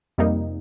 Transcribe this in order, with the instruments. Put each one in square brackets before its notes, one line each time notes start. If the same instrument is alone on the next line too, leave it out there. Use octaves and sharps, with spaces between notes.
[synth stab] F2 C3 G3 A#3 D#4